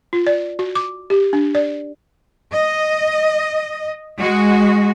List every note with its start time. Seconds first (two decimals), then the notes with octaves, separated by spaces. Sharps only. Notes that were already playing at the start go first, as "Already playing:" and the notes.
0.13 F4
0.27 D5
0.59 F#4
0.75 D6
1.10 G4
1.33 D4
1.55 D5
2.52 D#5
4.17 G#3 F#4